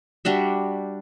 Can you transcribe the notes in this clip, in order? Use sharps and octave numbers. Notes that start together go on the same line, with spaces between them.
G3 D4 F#4 E5